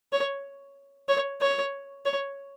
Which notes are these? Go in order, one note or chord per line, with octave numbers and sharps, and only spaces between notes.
C#5
C#5
C#5
C#5